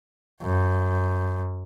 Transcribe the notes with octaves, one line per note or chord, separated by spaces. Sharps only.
F#2